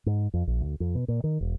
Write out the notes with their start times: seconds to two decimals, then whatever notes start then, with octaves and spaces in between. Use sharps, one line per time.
0.06 G#2
0.34 F2
0.47 A#1
0.61 D2
0.80 F2
0.95 B2
1.08 A#2
1.24 D#3
1.41 E1